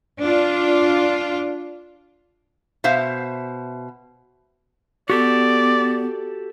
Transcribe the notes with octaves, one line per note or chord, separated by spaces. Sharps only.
D4 F4
B2 C5 E5 F5
B3 F#4 G4 A4 D5